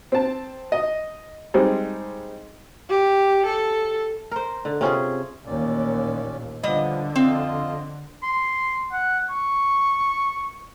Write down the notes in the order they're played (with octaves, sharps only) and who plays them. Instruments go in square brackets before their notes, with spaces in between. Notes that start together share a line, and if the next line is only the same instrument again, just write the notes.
[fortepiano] C4 A5
D#5
G3 G#3 C4 D#4
[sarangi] G4
A4
[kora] A#4 C5
D3
C3 C#4 F4 G#4
[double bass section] A1 D#2 A#2 [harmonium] C#4 D5
[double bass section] D3 [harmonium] F3 B3 [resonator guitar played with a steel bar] G3 D#5
[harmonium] F2 F4 D#5 [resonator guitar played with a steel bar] C4
[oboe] C6
F#5
C#6